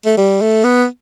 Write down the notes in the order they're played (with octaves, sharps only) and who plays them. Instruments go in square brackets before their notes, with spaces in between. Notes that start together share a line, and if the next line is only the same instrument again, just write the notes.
[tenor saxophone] A3
G3
A3
B3